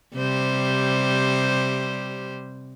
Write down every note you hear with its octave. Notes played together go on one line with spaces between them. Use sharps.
C3 G3 C5